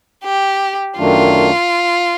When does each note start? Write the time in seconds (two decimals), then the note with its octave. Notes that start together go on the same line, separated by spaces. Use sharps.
0.24 G4
0.98 F#2 D#3 F#3 A3 D4 F4